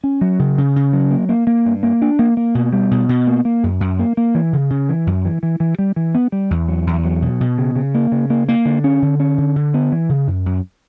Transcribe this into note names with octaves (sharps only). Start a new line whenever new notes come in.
C#4
F#3
C#3
C#3
C#3
F#3
A#3
A#3
A#3
G2
A#3
D4
A#3
A#3
B2
G3
B2
B2
A#3
A#3
F#2
F#2
A#3
A#3
E3
C#3
C#3
E3
F#2
E3
E3
E3
G3
E3
B3
G3
E2
F#3
E2
F#3
B2
B2
C#3
C#3
A#3
C#3
A#3
A#3
D3
C#4
D3
C#4
D3
D3
B3
E3
C#3
F#2
F#2